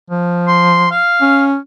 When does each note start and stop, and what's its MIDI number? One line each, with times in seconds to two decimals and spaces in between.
0.10 0.97 53
0.48 0.91 84
0.91 1.44 77
1.22 1.57 61